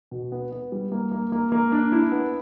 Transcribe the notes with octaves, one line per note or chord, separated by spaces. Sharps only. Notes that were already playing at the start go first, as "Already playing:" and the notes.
B2
B3
B3
G3
A#3
A#3
A#3
A#3
D4
E4
B3